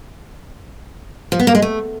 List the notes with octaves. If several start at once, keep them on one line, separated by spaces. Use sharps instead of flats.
F3
B3
A#3
G#3
A3